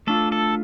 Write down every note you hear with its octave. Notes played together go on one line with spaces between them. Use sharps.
A3 D4 F4 A4
A4